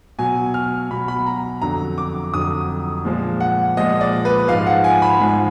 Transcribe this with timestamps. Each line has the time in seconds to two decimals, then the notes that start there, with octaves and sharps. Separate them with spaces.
0.19 B2 F#3 G#5
0.54 F6
0.90 B2 F#3 B5
1.08 B5
1.27 A#5
1.62 F2 D3 F#3 A#5
1.98 D6
2.34 F2 D3 F#3 D#6
3.05 A#2 F3 G#3
3.40 F#5
3.77 A#2 F3 G#3 D#5
4.01 D5
4.25 B4
4.48 G#2 F3 G#3 F5
4.67 F#5
4.84 G#5
5.02 B5
5.20 G#2 F3 G#3